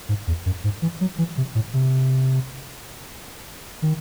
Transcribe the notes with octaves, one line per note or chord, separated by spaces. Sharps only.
G#2
E2
F#2
G#2
E3
F#3
E3
C3
A2
C3
D#3